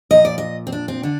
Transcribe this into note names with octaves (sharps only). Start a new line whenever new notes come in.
A#2 F3 D#5
D5
D#5
C4
D4
C4
D3 D4